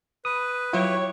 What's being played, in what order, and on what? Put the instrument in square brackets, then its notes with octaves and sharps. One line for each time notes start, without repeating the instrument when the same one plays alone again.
[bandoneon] B4 [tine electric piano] D#6
[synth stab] F#3 F4 [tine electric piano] E4 [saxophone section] G4 C#5